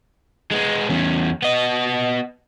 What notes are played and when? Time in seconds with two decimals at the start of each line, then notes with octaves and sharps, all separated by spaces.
0.51 G#3 B3
0.89 E2 C#4
1.42 B3 D#5